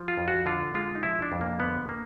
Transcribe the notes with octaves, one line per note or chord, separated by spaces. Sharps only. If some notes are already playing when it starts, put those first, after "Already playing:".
Already playing: F3
F4
F2
F#4
D3 F4
G#3 F4
D#4
F3 E4
D4
F2
A#3
D3 B3
A#3